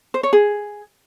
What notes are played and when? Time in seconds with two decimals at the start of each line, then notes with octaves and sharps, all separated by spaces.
0.14 C5
0.23 C#5
0.33 G#4